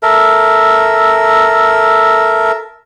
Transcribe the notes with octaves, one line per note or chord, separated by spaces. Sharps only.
A4 A#4 E5